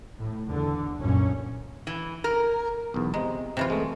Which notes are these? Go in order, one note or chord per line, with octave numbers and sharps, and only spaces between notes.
A2
E2 D3
C2 F#2 A#2 C#4
E3
A#4
B1 E2
C3 G#3 A#5
C3 E3 F4
G#3 A3